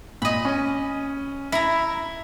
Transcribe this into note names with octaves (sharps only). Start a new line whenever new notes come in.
A#2 D#5 B5
C#4
E4 A#5 B6